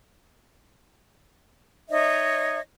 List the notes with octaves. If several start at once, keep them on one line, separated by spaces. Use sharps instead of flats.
D#4 C#5 D#5 E5